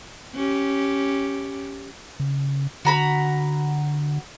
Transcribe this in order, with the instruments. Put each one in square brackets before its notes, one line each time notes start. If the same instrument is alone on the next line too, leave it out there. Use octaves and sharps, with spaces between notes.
[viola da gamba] C#4 G4
[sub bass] C#3
[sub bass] D3 [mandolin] F#4 A#5 B5